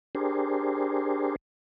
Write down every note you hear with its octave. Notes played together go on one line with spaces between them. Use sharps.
D4 G4 G#4 A#4 C5